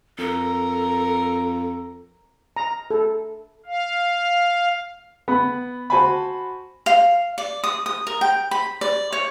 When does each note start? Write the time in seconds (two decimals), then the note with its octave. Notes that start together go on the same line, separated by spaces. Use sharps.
0.18 F2 A4 A#4 A#5
2.56 A#5
2.91 A4
3.66 F5
5.28 B3 B5
5.90 F#4 C5 G#5 A5 B5
6.86 F5
7.38 D5
7.64 D#6
7.86 D#6
8.07 A#4
8.21 G5
8.51 B5
8.81 D5
9.12 C#5